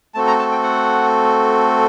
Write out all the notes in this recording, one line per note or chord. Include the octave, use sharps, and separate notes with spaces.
A3 C4 F#4 A4 A5
A#5
A5
G5
F#5